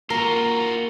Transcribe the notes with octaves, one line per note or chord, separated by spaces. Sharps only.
A#3 F4 F#4 A#4